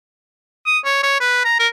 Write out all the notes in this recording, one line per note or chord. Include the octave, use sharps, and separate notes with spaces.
D#6
C#5
C#5
B4
A#5
A#4